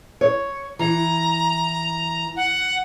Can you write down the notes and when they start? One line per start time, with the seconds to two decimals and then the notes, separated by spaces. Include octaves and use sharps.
0.21 C#5
0.79 E3 A#5
2.36 F#5